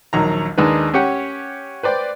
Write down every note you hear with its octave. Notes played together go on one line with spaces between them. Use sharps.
A#1 D#2 F#3 A#5
D#2 G#3 D4 D#4 B4
C#4 G4 C#5 F#5 G5
B4 C5 D5 G5